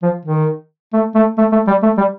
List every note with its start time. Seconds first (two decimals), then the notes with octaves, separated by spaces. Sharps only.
0.03 F3
0.26 D#3
0.94 A3
1.15 A3
1.38 A3
1.52 A3
1.67 G3
1.83 A3
1.98 G3